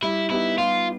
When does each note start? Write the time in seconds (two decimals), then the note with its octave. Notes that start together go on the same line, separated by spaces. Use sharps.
0.02 G3 E4
0.30 B3 D#4 E4 G4
0.57 G3 F4